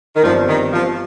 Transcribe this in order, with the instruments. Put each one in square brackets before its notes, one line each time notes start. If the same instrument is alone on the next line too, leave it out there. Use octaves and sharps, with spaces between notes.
[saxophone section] D#3
[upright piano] G1 G2 G3 C4 [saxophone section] F3
[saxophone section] D#3
F3